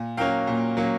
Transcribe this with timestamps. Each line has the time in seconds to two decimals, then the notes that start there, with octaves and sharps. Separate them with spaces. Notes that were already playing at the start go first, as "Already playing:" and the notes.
Already playing: A#2
0.17 F#3 A#3 C#4 F5 G5
0.47 A#2
0.77 F#3 A#3 C#4